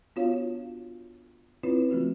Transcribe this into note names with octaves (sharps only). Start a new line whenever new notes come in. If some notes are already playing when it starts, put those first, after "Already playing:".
B3 D4 F4 F#4 C#5 F5
C4 C#4 E4 F4 B4 C#5
C#3 F3 A3 C4 F4 F#4